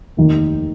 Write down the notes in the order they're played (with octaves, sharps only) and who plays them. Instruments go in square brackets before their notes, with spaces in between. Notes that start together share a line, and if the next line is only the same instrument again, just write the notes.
[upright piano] F1 D#2 D#3 A#3